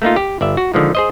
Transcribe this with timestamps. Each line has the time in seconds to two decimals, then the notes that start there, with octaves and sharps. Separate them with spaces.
0.02 A3 A#3 D#4 F4
0.16 G4
0.41 G1 D5 E5
0.57 F#4
0.74 D3 D#3 F3 G#3
0.95 G#4 C5 D#5